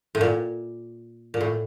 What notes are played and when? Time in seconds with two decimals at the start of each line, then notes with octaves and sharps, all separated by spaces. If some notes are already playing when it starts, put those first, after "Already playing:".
0.15 A2
0.21 A#2
1.34 A#2
1.41 A2